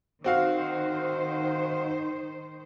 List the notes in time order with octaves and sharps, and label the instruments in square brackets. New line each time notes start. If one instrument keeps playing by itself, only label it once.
[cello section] D#3 C5 [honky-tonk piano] C4 F#4 F5